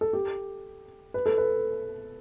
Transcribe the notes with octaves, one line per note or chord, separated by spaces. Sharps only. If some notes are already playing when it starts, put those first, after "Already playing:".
A4
G4
B4
A4
B4